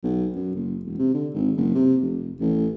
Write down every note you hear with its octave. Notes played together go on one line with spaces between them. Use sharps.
B1
F#2
F#1
E1
C3
D3
G#1
F#1
C3
F1
A1